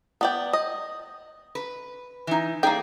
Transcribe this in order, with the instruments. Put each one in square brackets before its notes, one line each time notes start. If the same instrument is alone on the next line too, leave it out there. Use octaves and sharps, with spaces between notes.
[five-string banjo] B3 D5 G5
D#5
[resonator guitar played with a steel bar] B4
E3 D#4
[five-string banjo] A#3 G5 [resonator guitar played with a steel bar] D#4 G#4 D5